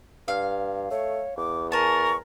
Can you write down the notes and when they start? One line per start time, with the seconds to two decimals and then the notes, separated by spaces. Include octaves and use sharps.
0.28 G2 F5
0.91 A3 C#5
1.37 E2 D6
1.72 A#4 G#5 A5 C#6